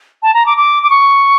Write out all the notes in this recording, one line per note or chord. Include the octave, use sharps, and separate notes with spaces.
A5
A#5
D6
D6
D6
C#6